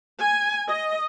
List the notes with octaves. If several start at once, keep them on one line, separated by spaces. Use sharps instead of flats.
G#5
D#5